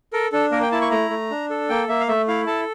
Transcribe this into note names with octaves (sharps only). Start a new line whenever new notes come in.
A4 A#4
D4 A4
A#3 A#4
G5
E4 A5
C#6
A3 A#5
A3
D4
A4
A#3 G5
A#3 E5
F5
A3 E5
E4 F5
A4 A5